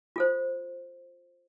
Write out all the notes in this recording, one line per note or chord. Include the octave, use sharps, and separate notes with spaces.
F4 A4 C5